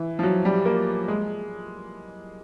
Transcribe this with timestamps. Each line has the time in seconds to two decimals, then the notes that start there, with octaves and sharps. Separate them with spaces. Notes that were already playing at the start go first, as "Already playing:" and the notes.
Already playing: E3
0.19 F3
0.23 F#3
0.45 G3
0.66 A#3
1.08 G#3